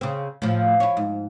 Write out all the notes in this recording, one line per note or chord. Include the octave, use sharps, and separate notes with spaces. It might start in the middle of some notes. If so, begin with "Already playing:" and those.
C#3 C4
A2 F3
E4 C#5
G#2